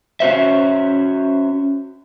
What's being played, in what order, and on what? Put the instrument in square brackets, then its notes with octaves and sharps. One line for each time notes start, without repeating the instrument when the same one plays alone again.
[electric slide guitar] C#4 F#4 C5 E5